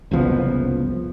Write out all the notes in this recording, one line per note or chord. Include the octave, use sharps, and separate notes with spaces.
F#1 C2 F3 B3